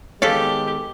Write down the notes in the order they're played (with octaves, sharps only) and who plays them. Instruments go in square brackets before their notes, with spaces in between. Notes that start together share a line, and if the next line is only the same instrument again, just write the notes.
[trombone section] D#3 G#3 B3 [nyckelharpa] G4 [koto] A4 F5 [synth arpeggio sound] C#5 B6